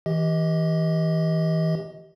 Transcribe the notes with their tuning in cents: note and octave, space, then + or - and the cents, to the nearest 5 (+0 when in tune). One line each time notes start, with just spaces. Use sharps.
E3 -30 G4 +0 D#5 +20